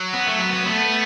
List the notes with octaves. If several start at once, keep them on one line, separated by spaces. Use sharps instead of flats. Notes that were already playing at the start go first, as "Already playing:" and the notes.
Already playing: F#3
B3
A3
B3
B3
A3 B3